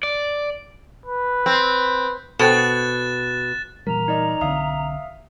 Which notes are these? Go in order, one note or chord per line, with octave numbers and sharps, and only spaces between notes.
D5
B4
C4
B2 A4 C5 G5 F#6 A6 E7
A#2 E3 G3 A#4 A#5
D#4 D5 D#5
B1 D3 C4 E5 F5 D#6